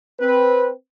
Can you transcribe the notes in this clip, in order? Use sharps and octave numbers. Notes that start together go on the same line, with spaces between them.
C4 B4